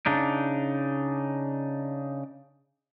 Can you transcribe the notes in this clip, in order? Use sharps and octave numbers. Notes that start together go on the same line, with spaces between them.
C#3 D4 D#4